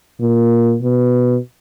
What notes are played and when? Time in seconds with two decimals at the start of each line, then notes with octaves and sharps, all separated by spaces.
0.20 A#2
0.82 B2